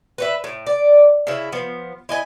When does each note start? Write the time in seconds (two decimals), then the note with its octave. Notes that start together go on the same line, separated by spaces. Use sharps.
0.18 B4 C#5 E5
0.44 A2
0.67 D5
1.27 C#3 E4
1.52 F3 B3
2.09 E4 D#5 G#5